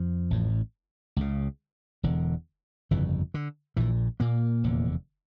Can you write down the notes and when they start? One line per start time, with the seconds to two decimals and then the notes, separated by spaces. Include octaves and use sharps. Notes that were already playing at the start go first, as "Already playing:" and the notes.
Already playing: F2 F3
0.31 A1 A2
1.16 C#2 C#3
2.03 E1 E2 D3
2.91 G1 F2 C#3 E3
3.34 D3
3.77 A#1 A#2 E3
4.20 A#2 A#3
4.64 F1 E2 D3